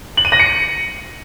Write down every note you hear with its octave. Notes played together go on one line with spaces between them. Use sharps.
F#7
D#7
A#6
C#7